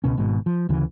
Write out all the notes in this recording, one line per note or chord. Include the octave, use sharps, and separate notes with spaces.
C#2 B2 C#4
G#1 G#2 B2
F3
D2 C#3 E3